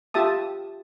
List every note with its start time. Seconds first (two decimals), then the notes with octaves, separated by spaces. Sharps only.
0.14 F4 G4 E5 A5 D#6